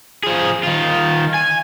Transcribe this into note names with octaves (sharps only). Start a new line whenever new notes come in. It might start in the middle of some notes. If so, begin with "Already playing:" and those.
F3 G#4
D#3 F4
G#5